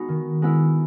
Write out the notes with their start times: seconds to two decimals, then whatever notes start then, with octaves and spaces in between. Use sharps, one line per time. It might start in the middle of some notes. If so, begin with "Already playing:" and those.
Already playing: G#3 B3 D#4 F#4
0.09 D#3
0.42 G#3 B3 E4